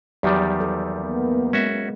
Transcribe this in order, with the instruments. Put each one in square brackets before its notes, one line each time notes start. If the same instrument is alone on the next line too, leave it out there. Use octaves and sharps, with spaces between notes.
[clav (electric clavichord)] E2 D#3 G3 [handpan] F#3 G4 D5
[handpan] A4
[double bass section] A#3 B3
[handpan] G#3 [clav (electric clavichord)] C#4 F#4 E5